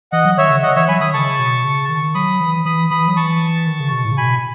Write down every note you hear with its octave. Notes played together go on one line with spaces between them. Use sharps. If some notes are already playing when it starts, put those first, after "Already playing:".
E3 D#5 F#5
F#3
D#3 C#5 E5
C#3
D#5 F#5
E3 C#5 E5
F#3 G#5 B5
D#3 B5 D#6
C#3 A5 C#6
B2
C#3
D#3
F#3 B5 D#6
E3
E3 B5 D#6
E3 B5 D#6
F#3
E3 A5 C#6
D#3
C#3
B2
A2
C#3
B2 G#5 B5